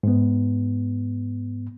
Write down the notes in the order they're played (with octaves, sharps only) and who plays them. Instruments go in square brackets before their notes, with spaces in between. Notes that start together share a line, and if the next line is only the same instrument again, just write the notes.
[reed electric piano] G#2 B3